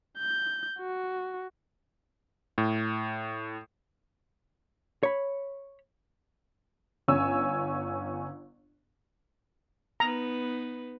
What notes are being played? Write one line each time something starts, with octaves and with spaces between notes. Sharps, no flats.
G6
F#4
A2
C#5 B5
G1 C#4 C#5 G#5 E6
B3 D#4 B4 A#5